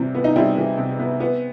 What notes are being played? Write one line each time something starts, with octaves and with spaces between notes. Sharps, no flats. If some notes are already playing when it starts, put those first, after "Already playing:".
Already playing: C3 E3 G3 C4
B3
D#4
G3 C4 E4
E3
C3
B3
B3